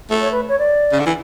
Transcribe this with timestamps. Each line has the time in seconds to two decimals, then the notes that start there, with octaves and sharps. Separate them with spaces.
0.10 A3
0.21 C#5
0.31 B4
0.49 C#5
0.59 D5
0.92 C#3
0.99 D3
1.06 E3